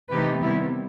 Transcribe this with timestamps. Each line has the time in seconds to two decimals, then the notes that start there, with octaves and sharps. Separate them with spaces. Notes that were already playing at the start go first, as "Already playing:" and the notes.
0.12 C3 E3 A3 D#4 G4 B4
0.41 C3 D#3 G3 B3 E4 G4